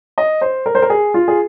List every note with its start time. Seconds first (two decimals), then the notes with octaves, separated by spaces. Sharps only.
0.18 D#5
0.41 C5
0.66 A#4
0.75 C5
0.82 A#4
0.90 G#4
1.14 F4
1.28 G#4